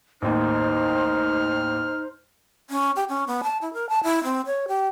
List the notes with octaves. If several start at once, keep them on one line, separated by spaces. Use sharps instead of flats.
A1 D#2 D#4 C5 F6
C#4
G4
C#4
B3
A5
E4
A#4
A5
E4
C4
C#5
G4